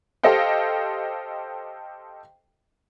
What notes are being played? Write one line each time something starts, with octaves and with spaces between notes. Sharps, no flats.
G4 A4 C5 D#5 F5 G5